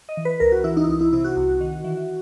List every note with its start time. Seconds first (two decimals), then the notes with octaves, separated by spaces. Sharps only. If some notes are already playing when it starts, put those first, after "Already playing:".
0.09 D#5
0.17 E3
0.25 B4
0.40 C#2 A#4
0.52 F#4
0.64 E3 E4
0.77 D#4
0.84 E4
0.88 C2 D#4
1.01 E4
1.13 C3 E4
1.24 F#4
1.37 C2
1.61 D#3
1.84 E3